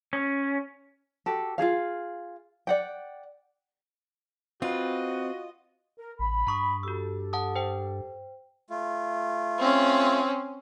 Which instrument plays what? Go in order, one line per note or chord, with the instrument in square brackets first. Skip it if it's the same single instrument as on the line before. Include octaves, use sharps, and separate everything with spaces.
[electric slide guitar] C#4
[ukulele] F#4 G4 A4
F4 F#4 G#4 F5
D5 F#5 G5
[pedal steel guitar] C4 B4 [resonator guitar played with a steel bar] F4 [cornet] F#4 [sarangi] D#5
[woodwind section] A#4
[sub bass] A1 [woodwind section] B5
[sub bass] G2 [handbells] A#5 C#6 D#6
[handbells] F#4 E6 [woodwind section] G4 A4
[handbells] F#5 A5 D#6
C5 G5
[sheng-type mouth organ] A3 F4
[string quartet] C4 C#4